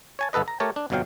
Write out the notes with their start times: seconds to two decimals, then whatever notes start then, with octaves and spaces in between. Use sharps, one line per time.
0.19 C#5 G#5 A5
0.33 G1 B3 A4 B4 D#5
0.48 A#5
0.60 A3 G4 A#4 C#5 A5
0.76 D4
0.90 G1 F2 B2 F#3 F5 G5